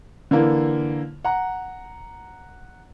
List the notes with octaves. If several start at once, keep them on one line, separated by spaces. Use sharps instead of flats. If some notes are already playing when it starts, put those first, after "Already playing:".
D3 E3 A#3
F#5 A#5